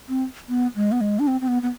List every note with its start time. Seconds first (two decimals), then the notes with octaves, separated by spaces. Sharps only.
0.09 C4
0.49 B3
0.76 G#3
0.92 B3
1.01 G#3
1.19 D4
1.27 C4
1.41 C4
1.48 B3
1.63 B3